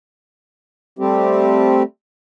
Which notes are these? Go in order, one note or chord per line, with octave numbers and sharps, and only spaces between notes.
G3 A3 C4 G4